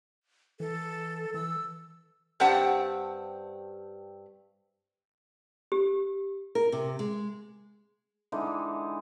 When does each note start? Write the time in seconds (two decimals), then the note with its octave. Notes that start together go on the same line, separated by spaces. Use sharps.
0.60 E3 A4
1.34 E3 E6
2.40 G2 C4 G4 F#5 A5
5.72 G4
6.55 A#4
6.72 C3
6.99 G#3
8.32 D3 E3 G#3 D#4